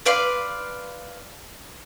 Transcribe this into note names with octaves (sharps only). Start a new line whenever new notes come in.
B4 D5 F5 C6